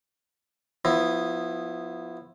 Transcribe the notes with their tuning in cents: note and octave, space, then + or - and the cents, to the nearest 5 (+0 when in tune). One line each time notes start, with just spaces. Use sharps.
F3 +25 B3 +0 E4 +0